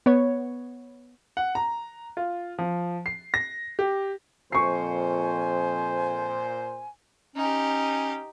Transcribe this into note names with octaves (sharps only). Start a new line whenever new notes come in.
B3 C#5
F#5
A#5
F4
F3
C7
A#6
G4
F2 A#2 C5 G#5 C#6 C7
C#4 D#4 G4